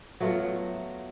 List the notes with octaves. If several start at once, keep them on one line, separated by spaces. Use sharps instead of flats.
F#3 A3 B3 F4